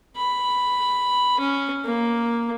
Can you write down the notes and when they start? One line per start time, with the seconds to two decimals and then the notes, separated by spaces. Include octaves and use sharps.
0.17 B5
1.40 C#4
1.85 A#3